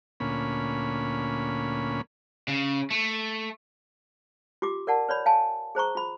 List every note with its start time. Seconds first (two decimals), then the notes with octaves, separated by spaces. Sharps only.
0.20 D2 A#2 C#4 B5
2.48 C#3
2.91 A3
4.62 F4 G4 D6
4.87 A#4 D5 F#5 A5
5.09 B4 C#5 D5 B5
5.26 F5 G#5 A5
5.75 G#4 C5 A#5 C#6
5.95 F4 B5